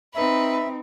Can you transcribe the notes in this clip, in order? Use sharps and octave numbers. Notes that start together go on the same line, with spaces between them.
C4 D#4 B4 E5